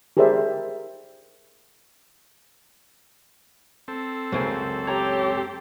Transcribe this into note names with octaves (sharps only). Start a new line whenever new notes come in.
G4 G#4 A#4 C5 D5 E5
C4 A4
C#2 F#2 G#4 A#4 C5
G4 C#5 A#5